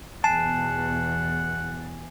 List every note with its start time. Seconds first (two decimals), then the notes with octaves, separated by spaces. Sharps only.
0.24 E2 B2 F#5 G#5 A5 C7 E7